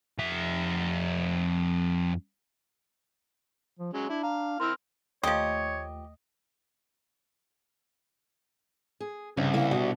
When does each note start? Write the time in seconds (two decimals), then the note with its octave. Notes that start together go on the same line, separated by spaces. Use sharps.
0.19 F2 E5
3.79 F3
3.93 F#3 G#3 C#4
4.10 D4 E4
4.23 F5 A#5
4.60 C4 E4 A#4 C6 E6 F6
5.23 D#2 F3 A3 G4 C#5 D#5
9.00 G#4
9.37 C2 G2 C#3
9.54 A#3 E4 F5
9.71 B2 D4 F#4 F#5